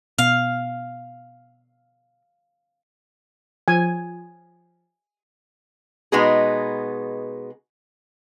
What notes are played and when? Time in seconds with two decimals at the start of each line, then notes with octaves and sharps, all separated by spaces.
0.18 B2 F5
3.68 F3 G#5
6.12 B2 G#3 B3 D#4 F#4 G#4